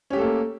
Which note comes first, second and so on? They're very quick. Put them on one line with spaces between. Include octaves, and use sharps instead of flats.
C#4 G4 A3 A4 A#3